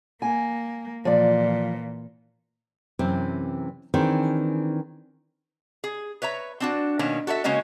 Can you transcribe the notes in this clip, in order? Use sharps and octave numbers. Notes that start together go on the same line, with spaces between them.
A#3 G#5
A#2 E3 F3 D5
F#2 C3 E3 C4
D#3 E3 C4 D4 G#4
G#4
B4 C#5 E5 A#5
C4 D4 F#4
B2 D#3 A#3 C#4
F#4 A4 C#5 E5
C#3 G#3 A#3 C#4 F#4 D#5